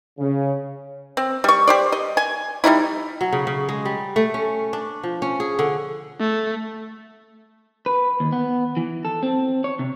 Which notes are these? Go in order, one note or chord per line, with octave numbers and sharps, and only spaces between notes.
C#3
C4
G3 C#6
G4 C5 D5
D#5
G#5
G3 C4 D#4 E4
F#3
C#3
C#3
G#3
G3
A3
C#4
D4
F3
C#4
G#4
D3
A3
B4
D#2
B3
E3
A4
C4
C#5
C3